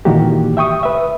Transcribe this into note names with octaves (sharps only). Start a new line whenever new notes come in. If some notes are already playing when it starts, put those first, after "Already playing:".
A#2 D#3 E3 A#3 F#4 G4
E5 G5 C#6 D#6
B4 E5